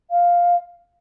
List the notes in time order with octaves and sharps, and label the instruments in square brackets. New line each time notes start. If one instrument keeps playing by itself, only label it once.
[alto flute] F5